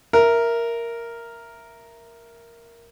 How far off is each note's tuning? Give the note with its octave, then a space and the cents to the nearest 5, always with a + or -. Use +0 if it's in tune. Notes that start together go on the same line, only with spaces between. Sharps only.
A#4 +0 E5 +5